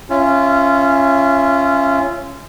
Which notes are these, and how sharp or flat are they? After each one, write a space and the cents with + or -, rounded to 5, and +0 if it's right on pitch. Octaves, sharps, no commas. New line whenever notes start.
C#4 +0 F4 -20 E5 +0